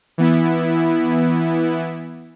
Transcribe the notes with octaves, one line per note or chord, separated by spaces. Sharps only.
E3 B3 E4